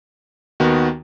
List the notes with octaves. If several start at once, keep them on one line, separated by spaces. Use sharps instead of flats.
D#2 D#3 B3 F#4